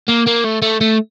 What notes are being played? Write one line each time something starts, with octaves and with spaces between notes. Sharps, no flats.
A#3
A#3
A3
A3
A3